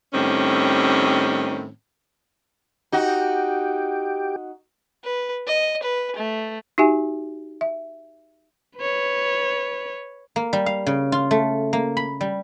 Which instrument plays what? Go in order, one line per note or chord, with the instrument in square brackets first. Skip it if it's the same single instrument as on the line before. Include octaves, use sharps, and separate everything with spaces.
[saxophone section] A2 D#3 G3 C4 C#4
[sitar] D#4 F#4 [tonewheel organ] G4
[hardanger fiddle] B4
D#5
B4
A3
[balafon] D#4 F#4 G4 E5 G#5
E5
[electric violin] B4 C#5
[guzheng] A#3
G3
F5
C#3
F4
A3
A#3
B5
G3